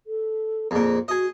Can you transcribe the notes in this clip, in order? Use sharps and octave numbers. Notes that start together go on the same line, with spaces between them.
A4
F2 A#2 G#4
F#4 G#4 D#5